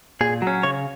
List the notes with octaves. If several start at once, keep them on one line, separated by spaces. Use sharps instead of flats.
A#2 G#4
F#3
C#4
C#3 C#5